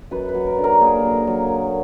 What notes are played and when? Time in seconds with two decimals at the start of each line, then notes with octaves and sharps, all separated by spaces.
0.11 F#2 B4
0.29 B4
0.34 F#3
0.47 A#4
0.58 D3
0.64 A#4
0.81 A#3 G#4
1.04 F#2
1.27 F#3